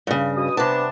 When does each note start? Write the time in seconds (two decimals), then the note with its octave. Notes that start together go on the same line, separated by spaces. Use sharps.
0.07 G2 C#3
0.37 B2 D#6
0.57 C3 B3 D4 A5